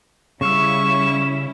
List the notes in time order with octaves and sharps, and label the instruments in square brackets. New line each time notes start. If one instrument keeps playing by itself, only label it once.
[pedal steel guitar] C#3 F5 E6 [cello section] G3 C#4 E4 [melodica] C#6 [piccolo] E7